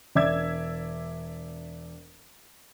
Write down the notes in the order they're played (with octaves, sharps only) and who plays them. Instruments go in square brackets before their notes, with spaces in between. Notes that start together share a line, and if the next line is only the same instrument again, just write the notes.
[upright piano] E1 D5 E5 E6 G#6